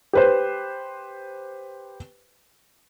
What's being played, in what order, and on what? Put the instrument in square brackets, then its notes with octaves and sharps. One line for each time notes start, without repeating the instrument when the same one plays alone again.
[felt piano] G4 B4 C5